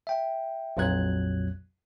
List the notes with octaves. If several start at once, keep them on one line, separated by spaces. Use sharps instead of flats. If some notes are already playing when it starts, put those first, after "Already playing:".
E5 G5
A#1 F2 A#2 F#3 F#6 G#6